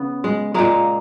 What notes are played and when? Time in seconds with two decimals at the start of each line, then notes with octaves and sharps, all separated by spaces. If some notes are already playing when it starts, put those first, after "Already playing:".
Already playing: C#3 B3
0.24 G#3
0.54 A#2 G#3 A#3